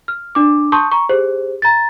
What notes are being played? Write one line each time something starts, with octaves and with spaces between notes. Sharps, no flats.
F6
D4 D6
A5 C6 C#6 D#6 G6
A#5 C#6
G4 G#4 C5
A#5 A6